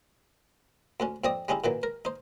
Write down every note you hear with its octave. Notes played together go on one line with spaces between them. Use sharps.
D2 D3 C#4
F2 A3 C4 D5 D#5 D#6
G3 G#3 C#4 D#4 E4
A#2 D#3 E3 F#3
A#4
D#4 C5